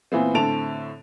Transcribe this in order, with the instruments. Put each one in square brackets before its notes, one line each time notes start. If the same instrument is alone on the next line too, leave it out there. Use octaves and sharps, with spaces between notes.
[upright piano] A#2 E3 B3 C4
A2 D3 C4 A5 D7 F7